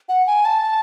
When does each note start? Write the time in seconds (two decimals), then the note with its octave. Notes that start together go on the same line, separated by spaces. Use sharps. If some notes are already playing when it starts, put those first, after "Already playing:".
0.09 F#5
0.27 G#5
0.45 A5